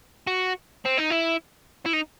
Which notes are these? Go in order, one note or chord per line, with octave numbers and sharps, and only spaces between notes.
F#4
C4
D#4
E4
E4
D#4